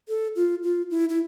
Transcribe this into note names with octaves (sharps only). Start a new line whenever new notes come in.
A4
F4
F4
E4
E4